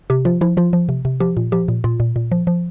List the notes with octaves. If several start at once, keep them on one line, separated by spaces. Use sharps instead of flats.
C3 G4
F3 F4
F3 E4
F3 F4
F3
C3
C3
F3 G4
A#2
F3 G4
A#2
A#2 F4
A#2
A#2
F3
F3